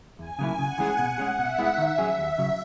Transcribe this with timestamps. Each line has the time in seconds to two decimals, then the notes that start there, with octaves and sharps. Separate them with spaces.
0.19 E2 G#5
0.39 C#3 F#3 A#3 E4
0.59 C#3 F#5
0.78 E3 G#3 C#4 G#4
0.98 B2 F#5
1.18 G#3 C#4 G#4
1.38 B2 E5
1.58 G#3 B3 E4
1.78 D#3 E5
1.98 F#3 C#4 G#4
2.18 D#2 E5
2.38 C#3 F#3